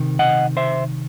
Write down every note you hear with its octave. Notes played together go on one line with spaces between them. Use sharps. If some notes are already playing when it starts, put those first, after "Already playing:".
Already playing: C3 D#3
D#5 F#5
C5 E5